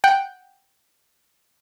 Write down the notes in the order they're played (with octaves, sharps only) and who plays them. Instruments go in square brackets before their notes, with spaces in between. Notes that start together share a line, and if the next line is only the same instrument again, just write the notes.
[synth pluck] F#5 G5